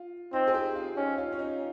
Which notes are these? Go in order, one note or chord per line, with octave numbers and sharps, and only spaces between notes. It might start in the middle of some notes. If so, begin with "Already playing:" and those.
Already playing: F4
C4 D#4
G#4
G4
F4
C#4 D#4
F4
C#4
D#4